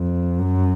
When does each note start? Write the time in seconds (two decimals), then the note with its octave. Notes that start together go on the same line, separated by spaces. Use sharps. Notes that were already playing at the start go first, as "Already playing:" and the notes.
Already playing: F2
0.39 F#2